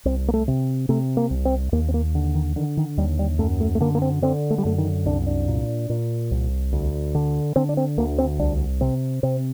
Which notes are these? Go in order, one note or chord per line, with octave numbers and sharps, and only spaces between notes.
C2 C4
A#3
A3
C3
C3 A3
A#3
C2
C4
D#2 A#3
C4
A#3
D3
D#3
D3 D#3
D#3
D#2 G3
G3
F#2 A3
A3
A3
D3 A#3
A#3
C4
D3 C4
A3
G3
F#2 A3
D#3
C2 D4
D4
A#2
A#2
C2
D2
D3
D3 C4
D4
C4
D2 A#3
C4
C2 D4
C3 C4
C3 C4